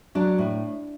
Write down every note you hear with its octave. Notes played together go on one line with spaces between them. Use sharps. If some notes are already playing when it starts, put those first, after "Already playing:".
F#3 D4
A2